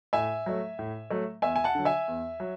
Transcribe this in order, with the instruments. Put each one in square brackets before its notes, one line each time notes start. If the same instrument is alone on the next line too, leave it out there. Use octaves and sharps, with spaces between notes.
[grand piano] A2 E5 G#5
F#3 A3
A2
F#3 A3
E2 E5 G#5
G#5
F#5 A5
D3 F#3
E5 G#5
E2
F#3